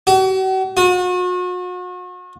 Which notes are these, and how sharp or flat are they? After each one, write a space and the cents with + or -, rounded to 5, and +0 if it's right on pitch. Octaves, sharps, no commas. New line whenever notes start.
F#4 +40
F#4 -40